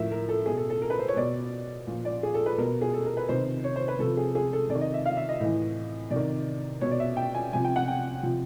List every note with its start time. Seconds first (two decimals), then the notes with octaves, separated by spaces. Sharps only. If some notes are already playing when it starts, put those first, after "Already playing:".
Already playing: A2 F3 A#4 E5
0.11 A#4
0.29 A4
0.46 B2 G#4
0.58 A4
0.70 A4
0.82 A#4
0.90 B4
0.99 C5
1.08 C#5
1.16 B2 D5
1.87 A#2 F3
2.05 D5
2.23 G#4
2.34 A4
2.46 B4
2.58 B2 A#4
2.81 G#4
2.94 A4
3.06 A#4
3.17 B4
3.29 C3 D#3 C5
3.64 C#5
3.76 C5
3.88 B4
3.99 C3 F3 A4
4.17 G#4
4.35 G#4
4.53 A4
4.70 C3 D5
4.75 D#3
4.81 D#5
4.94 E5
5.06 F5
5.17 E5
5.29 D#5
5.40 A2 E3
6.11 C3 D5
6.16 D#3
6.81 B2 C#5
6.91 D5
7.00 E5
7.17 G5
7.35 G#5
7.53 C3 F3 G#5
7.64 G5
7.76 F#5
7.88 G5
8.23 C3 F3